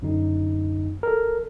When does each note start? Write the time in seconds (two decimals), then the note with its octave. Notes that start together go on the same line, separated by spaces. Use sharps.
0.02 F#2 D3 D#4
1.03 A4 A#4